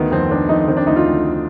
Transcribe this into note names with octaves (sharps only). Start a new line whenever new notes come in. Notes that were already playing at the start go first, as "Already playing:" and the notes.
Already playing: D2 D#3 B3
F2 C4
D#3 D4
F2 D#4
D#3 C4
D4
D2 D#4
F4
D2